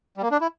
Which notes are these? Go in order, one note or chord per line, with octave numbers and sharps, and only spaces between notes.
G3
A#3
D4
E4